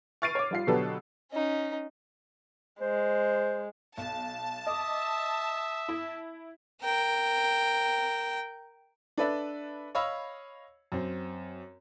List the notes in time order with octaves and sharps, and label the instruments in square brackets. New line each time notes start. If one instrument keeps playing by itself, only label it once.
[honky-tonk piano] C#6 F6 A6 C7 D7 D#7
C#5 D6
G3 F4 C7
B2 D3 F#3 G4 A4 B4
[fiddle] C#4 D#4
[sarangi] G#3 [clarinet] C5
[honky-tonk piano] B1 [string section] A5
[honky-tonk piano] D#5 D6 [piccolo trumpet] E5 [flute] D#6
[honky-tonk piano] E4
[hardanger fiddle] A#4 G5
[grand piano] D4 A4 B4 D5 E5
C#5 D#5 F5 B5 E6
F#2 C4